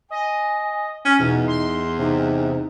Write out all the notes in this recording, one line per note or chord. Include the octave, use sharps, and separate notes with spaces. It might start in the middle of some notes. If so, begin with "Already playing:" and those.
D#5 G#5
C#4
E2 B2 D#4
C6
C3 D#4